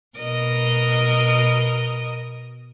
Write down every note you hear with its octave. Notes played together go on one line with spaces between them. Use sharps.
B2 A#4 D#5